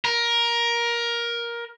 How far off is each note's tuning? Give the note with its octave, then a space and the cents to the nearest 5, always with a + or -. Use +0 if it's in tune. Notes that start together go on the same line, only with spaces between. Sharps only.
A#4 +15